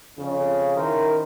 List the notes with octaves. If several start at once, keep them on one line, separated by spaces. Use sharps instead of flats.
F2 C#3
D#3 C#4 E4 A#4 C5